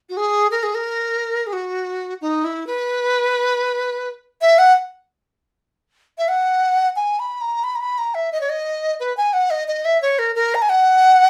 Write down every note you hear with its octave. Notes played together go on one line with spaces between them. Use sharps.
F#4
G#4
A#4
G#4
A#4
G#4
F#4
D#4
E4
B4
E5
F#5
E5
F#5
G#5
B5
A#5
B5
A#5
B5
A#5
E5
D#5
C#5
D#5
B4
G#5
F#5
D#5
D#5
E5
C#5
A#4
A#4
A#5
G#5
F#5